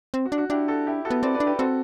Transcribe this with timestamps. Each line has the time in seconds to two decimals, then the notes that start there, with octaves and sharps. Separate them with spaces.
0.14 C4
0.26 F#4
0.32 D4
0.38 F#4
0.50 D4 E4 G4
0.68 F#4 A4
0.87 E4 G4
1.05 F#4 A4
1.10 B3
1.23 C4 B4 D5
1.34 B4 D5
1.40 D4
1.47 G4 B4
1.59 C4 F#4 A4